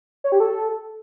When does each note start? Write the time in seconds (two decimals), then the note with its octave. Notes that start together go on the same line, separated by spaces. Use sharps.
0.24 C#5
0.32 G4
0.40 A4